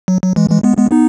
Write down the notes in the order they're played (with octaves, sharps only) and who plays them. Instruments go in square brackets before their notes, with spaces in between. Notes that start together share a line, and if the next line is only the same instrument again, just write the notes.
[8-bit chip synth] F#3
F#3
E3 G#3
E3 G#3
G#3 B3
G#3 B3
B3 D#4